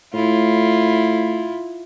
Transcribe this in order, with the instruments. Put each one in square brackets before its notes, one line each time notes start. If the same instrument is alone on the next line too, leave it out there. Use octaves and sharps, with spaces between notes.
[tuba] A2 [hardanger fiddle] E4 F4